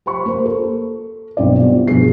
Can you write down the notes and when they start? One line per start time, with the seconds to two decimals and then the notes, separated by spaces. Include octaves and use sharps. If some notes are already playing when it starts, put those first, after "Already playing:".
0.06 G4 C5 B5 C#6
0.26 A#3 C5
0.46 A4
1.37 B1 G2 C4 E4 D5
1.60 B3 F4 G4
1.87 G2 B2 F3 G#4 C7